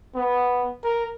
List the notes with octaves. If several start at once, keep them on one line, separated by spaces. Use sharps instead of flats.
B3
A#4